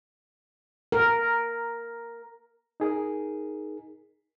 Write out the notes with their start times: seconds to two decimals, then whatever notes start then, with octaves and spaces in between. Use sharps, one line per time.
0.92 A#4
2.80 D#4 G#4 A#4